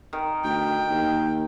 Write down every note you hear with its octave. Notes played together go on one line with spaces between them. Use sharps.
D#3
D2 G5
D#2